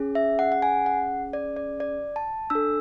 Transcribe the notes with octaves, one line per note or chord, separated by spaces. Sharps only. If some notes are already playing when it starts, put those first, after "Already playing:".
Already playing: C#4 G#4
E5
F#5
F#5
G#5
F#5
D5
D5
D5
A5
D4 A4 E6